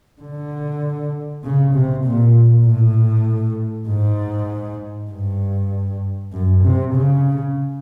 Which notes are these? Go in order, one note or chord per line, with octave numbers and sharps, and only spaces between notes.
D3
C#3
C3
A#2
A2
G#2
G2
F#2
C3
C#3